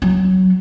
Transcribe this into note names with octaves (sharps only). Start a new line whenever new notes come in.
F#3